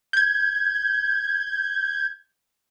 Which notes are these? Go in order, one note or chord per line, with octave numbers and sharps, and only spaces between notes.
G6 G#6